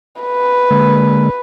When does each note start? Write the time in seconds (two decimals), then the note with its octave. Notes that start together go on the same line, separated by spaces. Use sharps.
0.21 B4
0.71 D3 G#3 A#3